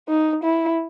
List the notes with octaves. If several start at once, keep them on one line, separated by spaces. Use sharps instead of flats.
D#4
E4